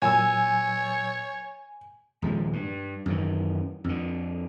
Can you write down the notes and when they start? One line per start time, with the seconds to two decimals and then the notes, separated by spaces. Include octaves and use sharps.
0.02 A#2 F#3 C#5 G#5 E6
2.22 D#1 F3 G#3
2.53 G2
3.06 F#2 D#3 E3
3.84 F2 D3